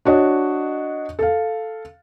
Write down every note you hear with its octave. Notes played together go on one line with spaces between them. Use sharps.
D4 F#4 C#5 D#5
A4 F5